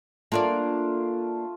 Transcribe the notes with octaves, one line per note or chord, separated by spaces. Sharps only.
A3 A#3 D4 F4 D5 A5